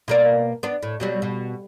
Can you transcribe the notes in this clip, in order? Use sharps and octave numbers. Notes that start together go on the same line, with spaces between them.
B2 A#3 D5
B3 D4
A2
B2 F#3 G3
B2